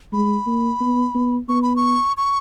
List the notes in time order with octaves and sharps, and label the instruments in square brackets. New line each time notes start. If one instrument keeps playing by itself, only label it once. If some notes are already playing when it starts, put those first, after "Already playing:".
[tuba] G#3 [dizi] B5
[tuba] A#3
B3
B3
[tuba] B3 [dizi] C#6
[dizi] B5
C#6
C#6